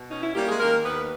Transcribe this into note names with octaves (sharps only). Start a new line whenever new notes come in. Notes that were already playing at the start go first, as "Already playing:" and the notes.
Already playing: B2
C#4 D#4
E4
G3 A#3 G4
G#3 G#4
D#3 A#3 A#4
D#2 B3 B4